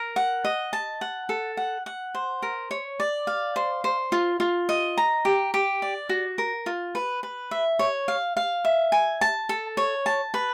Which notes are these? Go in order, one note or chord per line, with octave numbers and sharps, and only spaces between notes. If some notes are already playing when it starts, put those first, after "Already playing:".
Already playing: A#4
F#5
D#5
A5
F#5
A4
F#5
F#5
C5
A#4
C#5
D5
F5
C5
C5
F4
F4
D#5
A#5
G4
G4
D5
F#4
A#4
F4
B4
B4
E5
C#5
F5
F5
E5
G#5
A5
A4
C#5
A5
B4